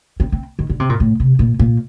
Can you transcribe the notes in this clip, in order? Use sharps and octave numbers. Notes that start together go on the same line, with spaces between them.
C4
C4
D#3
D3
C3
A#2
A2
C3
A#2
A#2